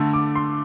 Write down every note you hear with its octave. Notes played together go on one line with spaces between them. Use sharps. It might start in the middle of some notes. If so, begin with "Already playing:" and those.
Already playing: D3 A3
D6
C6